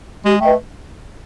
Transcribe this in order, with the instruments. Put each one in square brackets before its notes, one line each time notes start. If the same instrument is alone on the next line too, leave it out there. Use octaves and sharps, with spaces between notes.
[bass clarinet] G#3 [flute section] G4
[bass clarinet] A3 [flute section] B4 D#5 G5